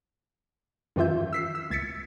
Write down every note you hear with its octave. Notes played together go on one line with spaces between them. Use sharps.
F#2 D#3 E3 F4 E5 G6
E6 B6 C7
E6
C#2 G#6 A6 B6 C#7